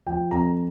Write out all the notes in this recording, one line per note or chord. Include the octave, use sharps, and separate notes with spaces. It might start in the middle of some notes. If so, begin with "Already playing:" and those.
F3 G5
F2 A#5